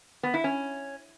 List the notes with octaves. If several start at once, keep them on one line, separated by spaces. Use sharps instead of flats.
B3
E4
C#4